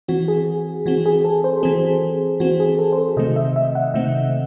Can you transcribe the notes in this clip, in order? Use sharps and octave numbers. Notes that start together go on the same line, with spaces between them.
E3 C4 F#4
G#4
E3 C4 F#4
G#4
A4
C5
E3 C4 G#4
E3 C4 F#4
G#4
A4
C5
A4
C3 D#3 A3 C4 D#5
E5
E5
F#5
C3 D#3 A3 C4 E5